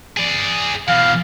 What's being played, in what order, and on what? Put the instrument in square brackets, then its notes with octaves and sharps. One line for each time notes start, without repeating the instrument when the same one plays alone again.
[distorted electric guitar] G#4 D5
[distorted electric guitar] B2 E3 [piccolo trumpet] F5